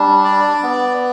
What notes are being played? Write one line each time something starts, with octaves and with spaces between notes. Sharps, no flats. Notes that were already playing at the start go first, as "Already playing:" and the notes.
Already playing: G3 D4
D5
B3